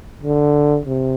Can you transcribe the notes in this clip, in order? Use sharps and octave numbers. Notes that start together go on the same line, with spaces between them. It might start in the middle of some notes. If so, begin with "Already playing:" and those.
D3
C3